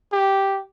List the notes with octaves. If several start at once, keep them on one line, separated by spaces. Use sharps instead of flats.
G4